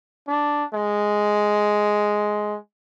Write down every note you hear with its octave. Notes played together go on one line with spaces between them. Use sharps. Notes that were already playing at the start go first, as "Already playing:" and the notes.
D4
G#3